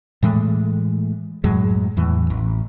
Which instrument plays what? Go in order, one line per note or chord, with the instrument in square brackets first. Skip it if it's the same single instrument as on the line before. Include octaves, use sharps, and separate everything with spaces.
[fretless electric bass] A2 E3 G#3 A3
F#2 A2 F#3 G#3
E2 A2 E3
A1